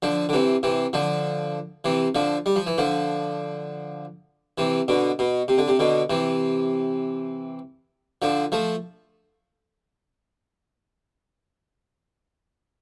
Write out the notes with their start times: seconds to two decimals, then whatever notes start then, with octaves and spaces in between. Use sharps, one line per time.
0.02 D3 F3
0.29 D3
0.33 C3 E3
0.63 C3 E3
0.93 D3 F3
1.84 C3 E3
2.15 D3 F3
2.46 G3
2.56 F3
2.67 E3
2.78 D3 F3
4.58 C3 E3
4.88 B2 D3
5.19 B2
5.48 C3
5.58 D3
5.68 C3
5.79 B2 D3
6.10 C3 E3
8.22 D3 F3
8.52 F3 A3